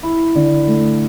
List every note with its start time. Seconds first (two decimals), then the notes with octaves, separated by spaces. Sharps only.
0.03 E4
0.35 D3
0.67 A3